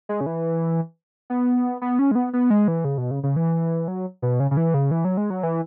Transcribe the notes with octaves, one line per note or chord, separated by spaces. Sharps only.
G#3
C#3
E3
B3
B3
C#4
G#3
B3
B3
G#3
E3
C#3
B2
C#3
C#3
E3
F#3
B2
C#3
C#3
E3
C#3
E3
F#3
G#3
F#3
E3